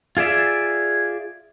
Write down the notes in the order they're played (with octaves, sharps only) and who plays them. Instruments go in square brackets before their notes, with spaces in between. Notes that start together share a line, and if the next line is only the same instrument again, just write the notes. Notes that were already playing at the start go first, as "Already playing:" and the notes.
[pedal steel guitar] F4 G#4 D5 E5